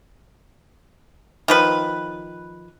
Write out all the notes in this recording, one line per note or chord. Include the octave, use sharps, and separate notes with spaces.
D#3 F3 B4